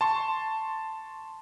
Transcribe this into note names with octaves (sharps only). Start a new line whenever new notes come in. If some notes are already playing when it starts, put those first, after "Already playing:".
A5 C6 C#6